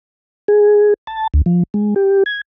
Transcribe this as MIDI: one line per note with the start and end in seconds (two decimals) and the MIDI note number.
0.48 0.94 68
1.07 1.27 81
1.34 1.41 38
1.46 1.63 53
1.74 1.94 56
1.96 2.23 67
2.26 2.41 92